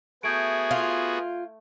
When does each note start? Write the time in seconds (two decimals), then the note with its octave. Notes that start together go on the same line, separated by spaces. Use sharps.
0.23 A3 B3 F#4 G#4 G6 G#6 D7
0.71 F4